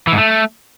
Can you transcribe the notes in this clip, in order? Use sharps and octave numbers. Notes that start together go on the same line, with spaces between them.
E3
G#2
A3